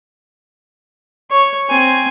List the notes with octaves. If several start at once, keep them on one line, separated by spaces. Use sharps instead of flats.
C#5
C4 G#5